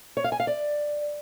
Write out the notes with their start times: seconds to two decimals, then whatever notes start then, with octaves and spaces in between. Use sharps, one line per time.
0.17 C#5
0.24 F5
0.32 G#5
0.40 F5
0.47 D5